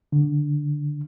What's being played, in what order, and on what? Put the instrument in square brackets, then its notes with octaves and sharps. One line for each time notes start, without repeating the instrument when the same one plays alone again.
[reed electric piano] D3